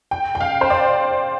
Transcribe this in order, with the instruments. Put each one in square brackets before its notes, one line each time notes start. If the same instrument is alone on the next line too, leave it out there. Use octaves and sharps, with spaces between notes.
[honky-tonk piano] G5
G5
F5
C5
D5